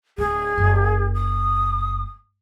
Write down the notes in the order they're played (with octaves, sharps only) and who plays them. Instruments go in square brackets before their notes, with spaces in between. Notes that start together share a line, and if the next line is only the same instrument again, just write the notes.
[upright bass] D1 [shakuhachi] G#4
[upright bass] F#1
[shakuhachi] D#6